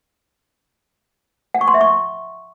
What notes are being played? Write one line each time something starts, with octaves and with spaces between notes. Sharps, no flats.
F#5
C#6
C6
E5
C#6